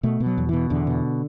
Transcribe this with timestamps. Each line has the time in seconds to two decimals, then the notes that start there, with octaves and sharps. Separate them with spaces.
0.03 B2 A3
0.20 B2
0.26 F#3
0.38 E2
0.49 B2 E3
0.70 E2 D3
0.87 B2